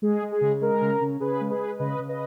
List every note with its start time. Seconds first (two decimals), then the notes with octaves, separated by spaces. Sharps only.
0.02 G#3 G#4
0.22 G#3
0.32 G#4
0.41 C#3
0.61 G#3 A#4
0.81 C#3
1.01 C#3
1.20 C#3 G#4 B4
1.40 G#3
1.50 G#4 B4
1.59 G#3
1.79 C#3 B4 D#5
1.99 C#3
2.08 B4 D#5